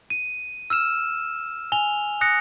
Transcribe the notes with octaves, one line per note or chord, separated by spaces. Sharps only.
D#7
E6 F6 E7
G#5 F7 G7
D#6 F#6 A#6 C#7